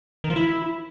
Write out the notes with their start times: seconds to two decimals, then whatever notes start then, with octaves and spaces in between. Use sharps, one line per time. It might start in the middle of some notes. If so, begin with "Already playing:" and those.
0.24 D#3
0.30 F3
0.36 E4